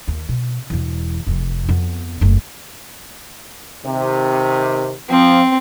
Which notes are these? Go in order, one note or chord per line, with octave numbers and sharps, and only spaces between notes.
D#2 A#3
B2
E1 E2
F1 F2
F2 B3
F#1 A3
C3 D#3
F3 C4